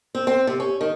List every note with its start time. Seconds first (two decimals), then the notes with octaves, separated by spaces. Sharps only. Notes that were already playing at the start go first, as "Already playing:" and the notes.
0.15 C4
0.27 C4
0.47 C3
0.60 C#4
0.81 D#3